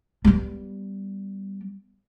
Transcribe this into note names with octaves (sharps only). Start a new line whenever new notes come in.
G3 B3